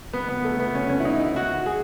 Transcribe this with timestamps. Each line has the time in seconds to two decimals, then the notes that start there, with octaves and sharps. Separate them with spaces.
0.13 B3
0.28 B3
0.44 A3
0.60 B3
0.75 C#4
0.89 C#4
1.00 E4
1.05 D#4
1.20 E4
1.36 F#4
1.66 G#4